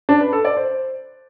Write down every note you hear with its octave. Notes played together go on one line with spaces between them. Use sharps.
D4
B4
A4
D5
C5